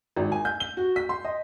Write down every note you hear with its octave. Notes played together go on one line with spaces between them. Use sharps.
G#1
G#5
G6
G7
F#4
B6
C6
D#5